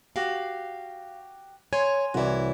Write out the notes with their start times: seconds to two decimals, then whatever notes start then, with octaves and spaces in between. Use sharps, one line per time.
0.16 F#4 G4 F5
1.73 C#5 G#5 C6
2.14 C2 E3 E4 F#4 C#5 D5